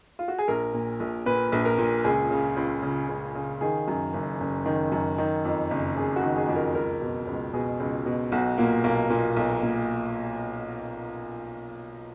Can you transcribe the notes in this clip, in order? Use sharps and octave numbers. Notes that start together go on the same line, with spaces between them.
F4
F#4
G#4
A#1 A#4
A#2
A#1
A#2 B4
A#1
A#4
A#2
C#2 G#4
C#3
C#2
C#3
C#2
C#3
D#3 G#4
F#2
F#1
F#1
D#3
F#2
D#3
F2
F#1
F#1 G#4
F#4
D#3
G#4
F2
A#4
C#2 A#4
B2
C#2
B2 G#4
C#2
B2
B1 F#4
A#2 A#3
B1 A#3
A#2
B1
A#2